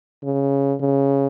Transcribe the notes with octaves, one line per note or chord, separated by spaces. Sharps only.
C#3
C#3